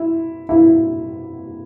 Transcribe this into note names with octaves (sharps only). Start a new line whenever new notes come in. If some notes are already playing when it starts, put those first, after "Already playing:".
Already playing: E4
E4